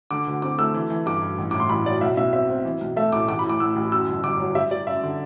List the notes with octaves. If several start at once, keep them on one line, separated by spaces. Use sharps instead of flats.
D3 D6
D2
C4 D6
A3 E6
E3
E3
G2 D6
G2
A1
A2 D6
C6
A1 B5
F#3 D5
B1 E5
B2 E5
C4 E5
C4
E3
B1
A3 E5
A2 D6
A1 D6
B5
A2
D6
A2 E6
A1
F#2 E6
G1
G1 D6
F#3
G3 E5
G3 D5
F#2 E5
D3